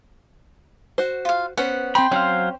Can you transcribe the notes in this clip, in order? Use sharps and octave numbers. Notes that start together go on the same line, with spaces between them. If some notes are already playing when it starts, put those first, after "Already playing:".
F#4 C5
F4 F5
B3 C#4 C5 F#5
C4 G5 B5 C6
F#3 C4 C#4 C5 F5